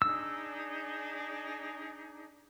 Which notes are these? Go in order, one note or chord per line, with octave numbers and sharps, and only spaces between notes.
D4 D#4 G#4 E6